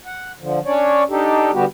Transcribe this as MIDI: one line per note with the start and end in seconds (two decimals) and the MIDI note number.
0.06 0.32 78
0.40 0.59 50
0.40 0.59 53
0.65 1.04 61
0.65 1.04 62
0.65 1.04 73
0.65 1.04 74
1.10 1.51 62
1.10 1.51 63
1.10 1.51 67
1.10 1.51 69
1.53 1.65 50
1.53 1.65 55
1.53 1.65 59
1.53 1.65 66
1.53 1.65 67